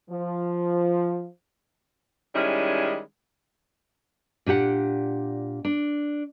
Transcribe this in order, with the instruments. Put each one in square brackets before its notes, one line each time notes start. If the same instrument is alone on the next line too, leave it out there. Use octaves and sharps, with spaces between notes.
[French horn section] F3
[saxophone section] D#3 G3 G#3 C#4 E4
[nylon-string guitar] A#2 D4 G4 F#5
D4